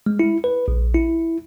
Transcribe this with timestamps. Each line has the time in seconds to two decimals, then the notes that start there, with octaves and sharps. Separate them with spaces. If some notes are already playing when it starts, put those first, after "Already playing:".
0.06 G#3
0.20 E4
0.44 B4
0.68 A#1
0.95 E4